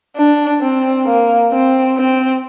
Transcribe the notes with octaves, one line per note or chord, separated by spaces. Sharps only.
D4
C4
A#3
C4
C4